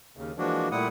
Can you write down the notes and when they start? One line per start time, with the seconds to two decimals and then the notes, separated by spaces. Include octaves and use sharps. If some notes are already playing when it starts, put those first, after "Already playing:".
0.17 D#2 C#3
0.38 E3 F3 G#3 A#3 D4 F#4
0.71 A#2 G3 A3 E4 F#5 D#6